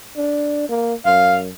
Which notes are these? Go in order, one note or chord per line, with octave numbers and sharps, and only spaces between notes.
D4
A#3
F#2 F5